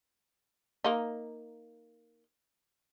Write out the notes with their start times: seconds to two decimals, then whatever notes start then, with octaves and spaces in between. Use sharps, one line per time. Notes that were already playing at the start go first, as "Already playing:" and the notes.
0.84 A#3 D#4